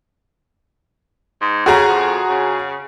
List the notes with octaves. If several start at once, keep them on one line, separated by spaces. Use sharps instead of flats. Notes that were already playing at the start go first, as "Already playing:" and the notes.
G#2
C#3 F#4 G#4 A#5
F2
C#3